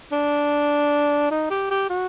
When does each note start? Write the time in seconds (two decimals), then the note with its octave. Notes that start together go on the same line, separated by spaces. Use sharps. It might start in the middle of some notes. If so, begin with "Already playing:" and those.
0.12 D4
1.31 D#4
1.50 G4
1.70 G4
1.90 F#4